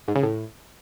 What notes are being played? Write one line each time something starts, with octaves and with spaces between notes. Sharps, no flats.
G#2
C#3
A2